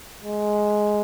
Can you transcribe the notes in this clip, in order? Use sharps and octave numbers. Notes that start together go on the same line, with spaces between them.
G#3